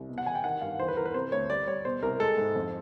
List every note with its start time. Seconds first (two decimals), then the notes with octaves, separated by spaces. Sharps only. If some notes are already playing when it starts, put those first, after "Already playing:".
Already playing: C2
0.09 B2
0.18 F#5
0.26 E2 G#5
0.35 G5
0.44 D#3 F#5
0.61 G2 F5
0.79 E3 C5
0.88 B4
0.96 E3 A#4
1.05 B4
1.14 C3 C5
1.32 D2 C#5
1.50 G3 D5
1.67 G3 C#5
1.85 B2 C5
2.02 C2 A#4
2.20 G#3 A4
2.38 G#2
2.55 F2